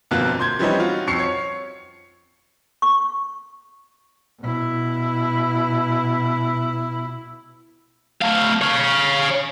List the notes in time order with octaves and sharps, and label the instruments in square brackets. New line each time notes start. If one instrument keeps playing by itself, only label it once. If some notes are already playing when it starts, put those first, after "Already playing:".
[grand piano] G1 F2 B2 A#3 F4 F#6
C6 G6 G#6
E3 F3 G3 C4 C#4 D#4
F4 F#4
F2 C#6 C7 C#7
C#5
[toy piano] C#6
[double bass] B2 E4
[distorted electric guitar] A3 F5
C#5 F5